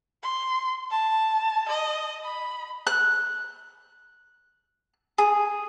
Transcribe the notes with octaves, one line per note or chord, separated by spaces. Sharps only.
C6
A5
D#5
B5
F#6
G#4